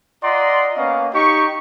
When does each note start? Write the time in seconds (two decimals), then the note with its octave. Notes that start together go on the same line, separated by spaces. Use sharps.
0.23 F4 D5 D#5 F#5 A#5 C6
0.77 A#3 B3 C#4 D#5 F5
1.14 D#4 G4 C#6